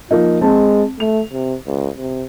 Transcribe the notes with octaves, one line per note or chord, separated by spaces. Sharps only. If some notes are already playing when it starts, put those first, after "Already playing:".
F3 A#3 D#4 F4
G#3 C4 A5
A3 F7
C3
C#2
C3